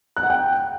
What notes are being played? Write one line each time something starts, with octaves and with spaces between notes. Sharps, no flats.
F#6
F#5
G5